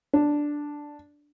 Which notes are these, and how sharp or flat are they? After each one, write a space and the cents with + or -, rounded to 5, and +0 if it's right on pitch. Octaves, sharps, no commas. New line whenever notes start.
D4 +0